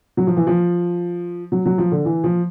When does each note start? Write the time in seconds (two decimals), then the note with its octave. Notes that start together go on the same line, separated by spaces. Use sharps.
0.17 F#3
0.27 F3
0.37 E3
0.47 F3
1.52 F#3
1.66 F#3
1.78 F3
1.92 D3
2.05 E3
2.24 F3